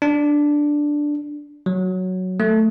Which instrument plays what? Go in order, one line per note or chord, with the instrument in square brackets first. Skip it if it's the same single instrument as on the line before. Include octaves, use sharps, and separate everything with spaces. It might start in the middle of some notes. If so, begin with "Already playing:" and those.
[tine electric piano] D4
F#3
A3